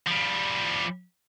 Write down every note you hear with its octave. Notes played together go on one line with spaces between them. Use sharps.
F3 G3